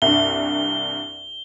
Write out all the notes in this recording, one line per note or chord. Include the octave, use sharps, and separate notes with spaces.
C2 G2 G7